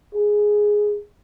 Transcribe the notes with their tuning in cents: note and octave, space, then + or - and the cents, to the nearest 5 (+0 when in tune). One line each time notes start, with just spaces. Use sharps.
G#4 +0